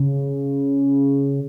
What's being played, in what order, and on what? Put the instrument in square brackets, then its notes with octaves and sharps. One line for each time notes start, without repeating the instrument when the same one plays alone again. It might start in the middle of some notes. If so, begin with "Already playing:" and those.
Already playing: [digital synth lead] C#3